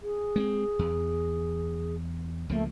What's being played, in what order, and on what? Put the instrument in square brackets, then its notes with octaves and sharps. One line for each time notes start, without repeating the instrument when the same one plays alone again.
[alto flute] G#4
[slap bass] G#3 B3 C4
E2
[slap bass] C#2 F3 A#3 [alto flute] A3